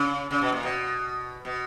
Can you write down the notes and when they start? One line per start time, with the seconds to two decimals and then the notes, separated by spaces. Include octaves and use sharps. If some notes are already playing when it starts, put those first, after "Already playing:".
Already playing: C#3
0.31 C#3
0.42 B2
0.52 A#2
0.63 B2
1.45 B2